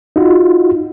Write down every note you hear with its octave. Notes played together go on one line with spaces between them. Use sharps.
D#4 F4 F#4